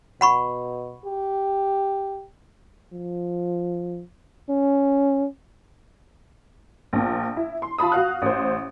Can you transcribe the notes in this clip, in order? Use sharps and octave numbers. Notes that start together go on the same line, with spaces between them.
B2 F#5 B5 C#6
G4
F3
C#4
A#1 A#2
E4
C6
F4 A5 B5 D#6
F#4 F5 F#6
A1 C5